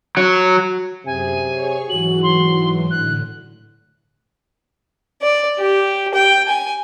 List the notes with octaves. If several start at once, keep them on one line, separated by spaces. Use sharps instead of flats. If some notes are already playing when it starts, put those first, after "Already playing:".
F#3
F#2 C3 G#4 G#5
G#4 C#5 C#6
G#2 E3 F#3 F#4 F#7
C6
A2 D3 F#6
D5
G4
G5
G#5